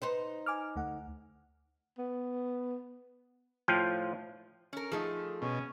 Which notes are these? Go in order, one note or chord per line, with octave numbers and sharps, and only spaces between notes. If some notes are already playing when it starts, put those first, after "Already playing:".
D#4 B4 C5
G#5 D6 F6
D2 A3 F#5
B3
A2 F3 F4 C5 F5 G5
C#4 A#4
F3 A3 D#4 G#4
B2 C#4